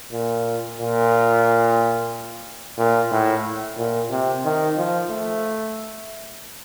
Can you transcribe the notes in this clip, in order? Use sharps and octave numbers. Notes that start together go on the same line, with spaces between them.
A#2
A#2
A#2
A2
A#2
C3
D#3
F3
A3